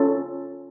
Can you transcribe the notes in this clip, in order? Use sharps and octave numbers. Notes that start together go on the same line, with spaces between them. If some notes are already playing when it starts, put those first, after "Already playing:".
Already playing: C#4 F4 A4